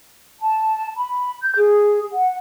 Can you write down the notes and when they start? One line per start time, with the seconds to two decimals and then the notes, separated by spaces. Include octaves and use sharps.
0.40 A5
0.96 B5
1.43 G6
1.56 G#4
2.12 F#5